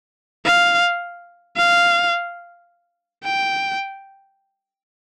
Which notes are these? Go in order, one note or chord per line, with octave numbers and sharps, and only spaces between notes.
F5
F5
G5